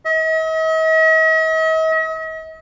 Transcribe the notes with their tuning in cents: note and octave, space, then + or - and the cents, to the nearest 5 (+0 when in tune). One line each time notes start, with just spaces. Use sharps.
D#5 +45